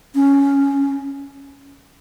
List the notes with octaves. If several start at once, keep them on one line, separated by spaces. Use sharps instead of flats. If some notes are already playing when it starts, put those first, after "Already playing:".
C#4